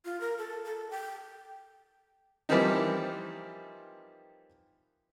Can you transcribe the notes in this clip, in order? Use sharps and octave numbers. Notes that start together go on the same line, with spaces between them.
F4
A#4
A4
A4
G5
E3 F3 G3 A#3 C4 D#4